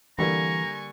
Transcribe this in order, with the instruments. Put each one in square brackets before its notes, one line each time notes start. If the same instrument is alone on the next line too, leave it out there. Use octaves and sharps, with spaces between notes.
[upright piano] D3 G3 A#3 [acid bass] E3 [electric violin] G#5 C#6 [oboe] A#5